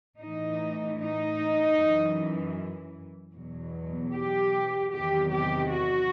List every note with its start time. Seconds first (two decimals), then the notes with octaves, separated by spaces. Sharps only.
0.20 A2 E3 D#4
0.98 D#4
1.76 F#2 E3
3.34 E2 B2 F#3
4.13 G4
4.91 E2 C3 D#3 F#3 G4
5.31 G4
5.70 F#4